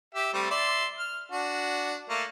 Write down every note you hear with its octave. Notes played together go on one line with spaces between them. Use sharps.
G4 E5
G3 A3 C4
D5 E5 C6
F6
D4 F#4
A3 A#3